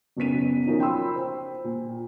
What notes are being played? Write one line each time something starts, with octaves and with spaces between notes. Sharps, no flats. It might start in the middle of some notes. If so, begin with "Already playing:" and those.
F#1 B1 B3 B6 D#7
F3 F#3 C#4 D#4 F4 A#4
G5 B5 C6 E6
C5 G5
A#2